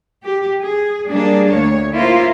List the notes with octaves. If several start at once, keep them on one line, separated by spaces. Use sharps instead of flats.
G4
G#4
G3 A#3 D4 G#4
D2 C#5
A#3 E4 F4 C5